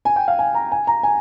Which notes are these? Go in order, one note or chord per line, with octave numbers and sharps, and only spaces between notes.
G#5
G5
F5
G#5
A#5
G#5
A#5
G#5